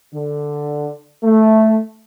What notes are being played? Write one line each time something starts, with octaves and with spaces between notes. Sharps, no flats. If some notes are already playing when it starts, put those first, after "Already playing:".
D3
A3